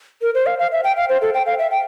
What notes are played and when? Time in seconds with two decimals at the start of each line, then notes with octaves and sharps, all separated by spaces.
0.22 A#4
0.34 C5
0.46 F5
0.59 F5
0.72 E5
0.84 G5
0.97 F5
1.09 C5
1.21 A4
1.34 G5
1.46 F5
1.59 E5
1.71 G5